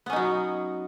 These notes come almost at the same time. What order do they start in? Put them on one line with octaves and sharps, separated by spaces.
B3 C#4 D#4 F#3